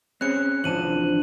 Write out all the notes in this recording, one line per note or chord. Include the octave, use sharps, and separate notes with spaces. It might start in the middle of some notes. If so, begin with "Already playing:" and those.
C4 C#4 G#4 F#6 C#7
G#1 E3 F3 D4 A5 D#7 F#7